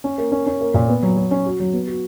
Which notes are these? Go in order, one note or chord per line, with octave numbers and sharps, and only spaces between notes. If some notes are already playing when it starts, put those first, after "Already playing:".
C#4
A#3
C#4
C#4
A#3
A#2
B3
F#3
F#3
C#4
F#4
F#3
B3
F#4